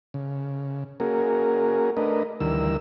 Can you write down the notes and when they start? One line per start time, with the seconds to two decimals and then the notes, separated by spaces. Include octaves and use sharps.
0.14 C#3
1.00 A#3 C#4 F#4 G#4 A#4
1.97 A3 D4 A#4 B4 D#5
2.40 D2 D#3 E3 G3 A#4 E6